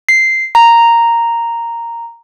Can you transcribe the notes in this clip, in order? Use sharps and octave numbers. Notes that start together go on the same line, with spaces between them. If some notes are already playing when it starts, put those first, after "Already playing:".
C7
A#5